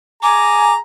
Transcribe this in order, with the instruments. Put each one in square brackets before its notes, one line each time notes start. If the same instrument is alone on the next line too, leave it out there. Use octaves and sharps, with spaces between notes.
[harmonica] G#4 A#5 [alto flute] G#5 [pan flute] D6